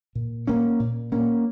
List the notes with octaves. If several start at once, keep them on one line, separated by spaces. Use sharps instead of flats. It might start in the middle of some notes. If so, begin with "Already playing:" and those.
A#2
A#3 C#4
A#2
A#3 C#4